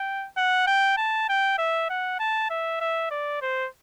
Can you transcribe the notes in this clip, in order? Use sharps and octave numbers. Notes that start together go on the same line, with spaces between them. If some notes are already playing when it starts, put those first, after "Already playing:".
Already playing: G5
F#5
G5
A5
G5
E5
F#5
A5
E5
E5
D5
C5